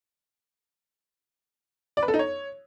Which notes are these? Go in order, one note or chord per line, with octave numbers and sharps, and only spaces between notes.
D5
B4
A4
D#4
C#5